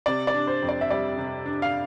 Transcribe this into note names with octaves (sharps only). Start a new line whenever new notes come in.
C3 D5
D5
D4
C5
F2
D5
E5
G3 D5
C3
D4
F5